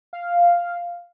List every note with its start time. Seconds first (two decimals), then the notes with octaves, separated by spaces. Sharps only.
0.13 F5